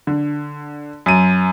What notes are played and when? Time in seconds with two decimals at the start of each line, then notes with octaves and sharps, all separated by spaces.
0.07 D3
1.06 F#2 D#7